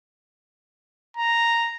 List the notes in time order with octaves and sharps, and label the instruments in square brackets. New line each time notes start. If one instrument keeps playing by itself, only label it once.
[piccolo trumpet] A#5